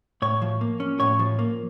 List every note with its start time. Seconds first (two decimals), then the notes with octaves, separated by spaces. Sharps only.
0.22 A2 C#5
0.42 F3
0.61 A#3
0.80 C#4
1.00 A2 C#5
1.19 F3
1.39 A#3